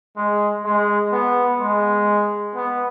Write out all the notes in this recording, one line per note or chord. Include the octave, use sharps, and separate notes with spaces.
G#3
G#3
B3
G#3
B3